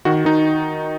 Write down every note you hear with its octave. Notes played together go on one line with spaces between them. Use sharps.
D#3 F#4
D#3 D#4